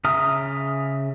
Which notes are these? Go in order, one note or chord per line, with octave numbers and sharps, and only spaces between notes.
C#3 E5 A#5 D#6 F6